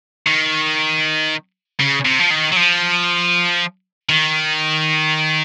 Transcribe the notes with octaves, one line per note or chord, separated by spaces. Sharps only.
D#3
C#3
C3
F3
D#3
F#3
F3
D#3